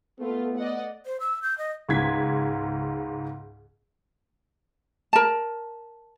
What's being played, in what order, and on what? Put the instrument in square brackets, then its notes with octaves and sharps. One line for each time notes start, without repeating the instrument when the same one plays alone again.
[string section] A3 F4 [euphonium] B3
[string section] D5 D#5 F#5
[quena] C5
E6
G6
D#5
[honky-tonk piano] C#2 G#2 G#6 B6
[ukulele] A#4 A5